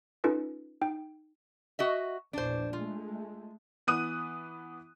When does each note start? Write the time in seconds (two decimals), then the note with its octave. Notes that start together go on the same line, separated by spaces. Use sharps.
0.24 C#4 D#4 F4 A4 B4
0.81 D#4 G5
1.79 F#4 D#5 E5
2.33 A#1 E2 D4 C5
2.73 G#3 A3 F4
3.87 E3 B3 D#6 F#6 D#7